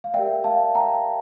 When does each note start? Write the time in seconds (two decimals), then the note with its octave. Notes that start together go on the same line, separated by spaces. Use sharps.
0.04 F5
0.14 G4 A#4 D5 E5 G5
0.44 F5 A5
0.75 G5 A#5